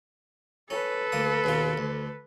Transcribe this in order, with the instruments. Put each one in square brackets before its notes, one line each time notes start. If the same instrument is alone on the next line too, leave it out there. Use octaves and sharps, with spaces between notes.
[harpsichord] C#4 [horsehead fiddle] A4 B4
[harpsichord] D2 A#3 D#6
D#2 B2 F4
D2